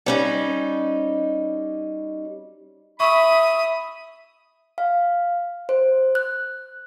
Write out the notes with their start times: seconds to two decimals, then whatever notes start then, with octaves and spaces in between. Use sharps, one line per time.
0.06 G3 C#4 D#4
3.00 E5 B5 C#6 D#6
4.78 F5
5.69 C5
6.15 F#6